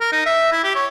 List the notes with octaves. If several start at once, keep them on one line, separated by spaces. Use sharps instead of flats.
A#4
D#4
E5
E4
G4
C#5